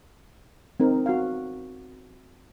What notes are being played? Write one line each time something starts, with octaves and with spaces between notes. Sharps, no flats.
C4 D#4 A#4
F#4 F5